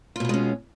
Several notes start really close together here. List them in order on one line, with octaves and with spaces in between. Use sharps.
F4 B2 B3 G#3 C#4